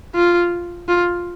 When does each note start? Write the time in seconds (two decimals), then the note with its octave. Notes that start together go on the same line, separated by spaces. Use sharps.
0.15 F4
0.88 F4